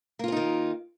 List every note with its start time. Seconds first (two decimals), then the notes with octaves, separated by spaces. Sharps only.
0.19 A#3
0.24 F4
0.28 C4
0.32 D#4
0.37 D#3